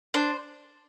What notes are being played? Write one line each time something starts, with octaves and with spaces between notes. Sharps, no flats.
D4 C5